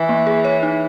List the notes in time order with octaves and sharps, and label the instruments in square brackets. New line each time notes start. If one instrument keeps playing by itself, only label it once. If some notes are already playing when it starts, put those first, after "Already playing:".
Already playing: [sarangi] E3
[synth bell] A#3
G#4
C#5
D#4